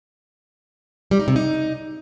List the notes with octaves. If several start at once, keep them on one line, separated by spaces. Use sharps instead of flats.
G3
D#4
C3
D#4